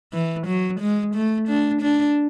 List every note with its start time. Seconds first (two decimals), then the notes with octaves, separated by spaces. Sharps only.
0.13 E3
0.47 F#3
0.80 G#3
1.15 A3
1.48 D4
1.81 D4